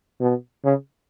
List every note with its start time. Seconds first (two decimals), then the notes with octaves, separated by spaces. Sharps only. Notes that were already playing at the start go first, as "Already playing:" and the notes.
0.20 B2
0.64 C#3